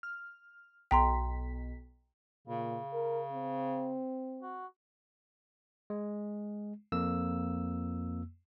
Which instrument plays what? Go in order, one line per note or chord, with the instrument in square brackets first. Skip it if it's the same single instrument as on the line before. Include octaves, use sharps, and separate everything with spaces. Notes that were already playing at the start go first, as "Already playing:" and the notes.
[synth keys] F6
[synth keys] B1 B6 [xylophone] G5 A#5 C6
[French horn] A#2 [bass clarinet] C#3
[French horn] A#4
C4
[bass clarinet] F#4
[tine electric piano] G#3
F2 A#3 E6